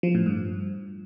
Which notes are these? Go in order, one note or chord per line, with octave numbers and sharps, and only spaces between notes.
F3
A2
G2